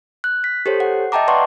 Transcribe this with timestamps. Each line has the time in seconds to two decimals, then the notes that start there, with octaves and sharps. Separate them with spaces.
0.24 F#6
0.44 B6
0.66 G4 A4 C5 C#5
0.80 F#5
1.12 D#5 E5 G5 A5 A#5 D6
1.28 B4 D5 F#5 A5 C6 C#6